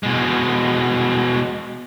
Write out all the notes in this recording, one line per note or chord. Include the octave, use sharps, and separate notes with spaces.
B2 G#3